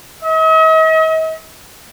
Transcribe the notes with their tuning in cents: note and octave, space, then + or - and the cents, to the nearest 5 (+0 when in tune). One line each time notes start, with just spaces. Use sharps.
D#5 +45